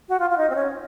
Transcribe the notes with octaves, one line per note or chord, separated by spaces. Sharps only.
F#4
F4
F4
D#4
C4
C#4